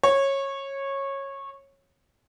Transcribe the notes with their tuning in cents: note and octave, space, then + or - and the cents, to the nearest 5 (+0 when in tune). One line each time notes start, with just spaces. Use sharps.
C#5 -15